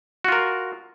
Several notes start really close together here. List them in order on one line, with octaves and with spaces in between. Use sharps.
F#4 F4 A#4